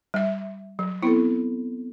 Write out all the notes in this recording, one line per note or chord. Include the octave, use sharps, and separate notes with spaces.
G3 E5
F#3
B3 C4 E4 A4